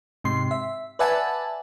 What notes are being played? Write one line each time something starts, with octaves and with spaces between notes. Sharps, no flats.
G#2 C3 C6 C7
E5
B4 D5 E5 F#5 G#5 A5